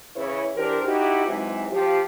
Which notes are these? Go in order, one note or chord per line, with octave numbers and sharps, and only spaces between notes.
C#3 E3 E4 B4 C#5
E3 D4 G4 A#4 C5
D#4 E4 F#4 G4
G#2 C3 E3 F#3 G#3
F3 G4